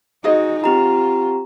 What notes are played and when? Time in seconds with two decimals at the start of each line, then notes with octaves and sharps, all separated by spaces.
0.24 D#4 F#4 G#4 C5 D#5
0.64 C4 F4 G4 A#5